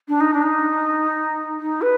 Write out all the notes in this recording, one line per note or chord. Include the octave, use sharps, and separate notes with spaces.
D4
D#4
D4
D#4
D#4
B4